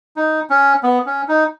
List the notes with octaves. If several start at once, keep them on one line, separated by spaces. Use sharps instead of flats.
D#4
C#4
B3
C#4
D#4